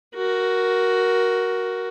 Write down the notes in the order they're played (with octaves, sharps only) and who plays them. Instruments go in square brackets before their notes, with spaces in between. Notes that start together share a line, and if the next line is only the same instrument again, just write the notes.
[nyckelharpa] F#4 A#4